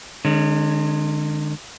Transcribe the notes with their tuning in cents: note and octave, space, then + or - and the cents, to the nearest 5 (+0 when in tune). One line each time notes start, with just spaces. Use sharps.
D3 +45 G#3 +0 C#4 +0